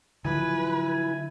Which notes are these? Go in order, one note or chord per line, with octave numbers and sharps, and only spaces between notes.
D3 F3 F#3 E4 B4 G#5